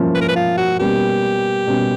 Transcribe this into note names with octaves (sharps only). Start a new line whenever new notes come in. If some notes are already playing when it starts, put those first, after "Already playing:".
Already playing: F3 A#3 C#4 E4
B4
A#4
B4
F4
F#4
B2 G3 A#3 C#4 G4
B2 G3 A#3 C#4